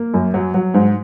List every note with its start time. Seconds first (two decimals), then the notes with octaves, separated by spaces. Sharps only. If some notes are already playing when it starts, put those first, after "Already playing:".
Already playing: A#3
0.14 F#2
0.34 F#3
0.54 F#3
0.74 G#2